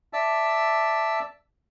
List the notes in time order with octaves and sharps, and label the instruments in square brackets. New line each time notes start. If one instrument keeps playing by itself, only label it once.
[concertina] D5 E5 A5 E6